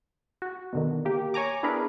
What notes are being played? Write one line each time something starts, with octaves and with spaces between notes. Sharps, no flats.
F#4
B2 D3 D#3
A#3 G4
C#5 G#5 A#5 D6
B3 D4 E4 G#4 A#4 B4